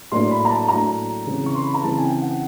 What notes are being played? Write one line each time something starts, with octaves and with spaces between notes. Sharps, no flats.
A2 F#3 A#3 D4 C6
B5
A#5
A5
A2 F#3 A#3 D4 A#5
C#3 E3 G#3 C4
C#6
C6
B5
A#5
C#3 E3 G#3 C4 A5
G#5
G5
F#5